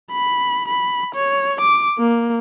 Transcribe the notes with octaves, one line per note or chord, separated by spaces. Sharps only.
B5
B5
C#5
D6
A#3